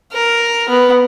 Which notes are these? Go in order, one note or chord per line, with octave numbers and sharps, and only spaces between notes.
A#4
B3